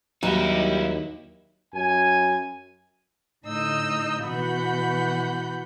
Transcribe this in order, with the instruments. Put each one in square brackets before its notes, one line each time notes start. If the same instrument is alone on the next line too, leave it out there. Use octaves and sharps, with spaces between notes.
[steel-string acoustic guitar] D#2 [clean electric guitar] F#3 [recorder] G3 [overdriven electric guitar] D#4 E4
[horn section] F#2 G#5
[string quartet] A2 D3 D#4 D#5 E6 G6
B2 E3 F#4 F#5 B5 G6